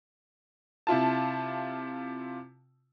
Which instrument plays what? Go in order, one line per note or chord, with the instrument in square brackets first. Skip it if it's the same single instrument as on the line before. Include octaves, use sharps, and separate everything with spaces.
[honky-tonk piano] C3 E4 F4 A5